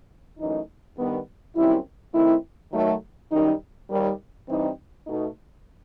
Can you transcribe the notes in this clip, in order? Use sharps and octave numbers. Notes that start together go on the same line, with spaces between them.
F#2 E3 A3 D#4
G2 D#3 G3 B3
F#2 D#3 G3 C4 E4
D#3 A3 C4 E4
D#3 F#3 A3
F#2 D#3 G3 D#4
D#2 D#3 G3
G2 E3 G3 C4 D#4
B2 A3 D#4